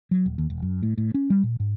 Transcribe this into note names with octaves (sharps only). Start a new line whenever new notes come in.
F#3
D#1
D#2
E1
F#2
A2
A2
C#4
G3
A#2
G#2